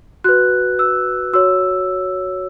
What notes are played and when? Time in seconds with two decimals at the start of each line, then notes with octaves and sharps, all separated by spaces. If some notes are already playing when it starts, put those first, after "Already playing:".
0.24 F#4 B4 F#6
0.79 E6
1.33 F#4 C#5 E6